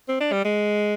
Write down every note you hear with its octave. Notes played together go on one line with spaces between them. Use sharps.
C4
D4
G3
G#3